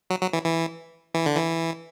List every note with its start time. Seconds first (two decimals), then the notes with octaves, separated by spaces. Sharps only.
0.10 F#3
0.22 F#3
0.33 E3
0.45 E3
1.14 E3
1.26 D3
1.37 E3